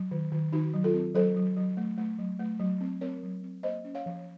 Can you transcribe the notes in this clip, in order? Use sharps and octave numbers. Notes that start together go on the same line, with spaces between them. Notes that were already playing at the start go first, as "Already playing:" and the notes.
Already playing: F#3
D#3
D#3
D#3 D#4 F#4
F#3
F4 A4
C4
F#3 A4 C5
F#3
F#3
A3
A3
F#3
A3
F#3
C4
C4 A#4 C#5
F#3
C4
A#3 C5 D#5
C#4
C#5 F5
F3